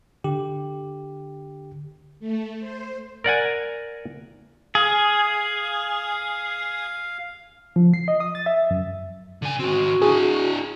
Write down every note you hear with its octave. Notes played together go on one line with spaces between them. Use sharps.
D3 G4
A3
C5
A#4 D5 F#5 G#5
G#4 F5
F3
C7
D#5
D#6
A6
E5
F#2
D3 G#5
D#3 C4 F#4
D4 E4 G#4